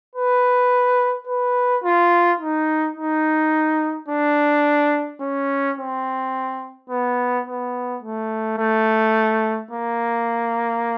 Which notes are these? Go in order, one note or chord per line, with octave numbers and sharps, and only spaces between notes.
B4
B4
F4
D#4
D#4
D4
C#4
C4
B3
B3
A3
A3
A#3